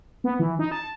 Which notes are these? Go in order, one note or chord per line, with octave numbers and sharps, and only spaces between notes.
B3
E3
D#4
A5